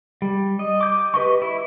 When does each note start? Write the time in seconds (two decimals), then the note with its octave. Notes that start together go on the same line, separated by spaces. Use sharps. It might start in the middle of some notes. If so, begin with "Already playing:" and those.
0.22 G3
0.59 D#5
0.81 D6 G6
1.14 G4 B4 D#5 C#6
1.42 E4